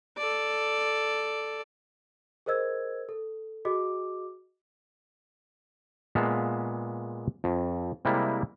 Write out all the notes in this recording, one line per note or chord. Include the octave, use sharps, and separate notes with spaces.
A4 D5
G#4 A#4 C5 D#5 E6 G#6
A4
F#4 G#4 D#5 D6
A#2 G#3 B3 E5 F5 A5
F2
C3 G3 G#3 A#3 E4